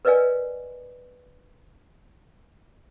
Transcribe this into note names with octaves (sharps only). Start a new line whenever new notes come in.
A#4 B4 D5 D#5 F5 G#5